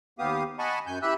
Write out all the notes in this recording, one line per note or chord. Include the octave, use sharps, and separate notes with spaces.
D#2 B3 G4 F5 D#6
D#5 F#5 G#5 A5 B5 C#6
F#2 G#5 G6
E3 G4 E5 B5 E6 F#6